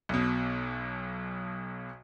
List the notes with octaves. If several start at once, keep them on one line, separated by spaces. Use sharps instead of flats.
B1 B2